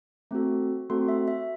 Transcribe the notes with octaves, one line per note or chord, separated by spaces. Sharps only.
A3 C4 F#4 A4
A3 C4 F#4 A4 C6
E5
E5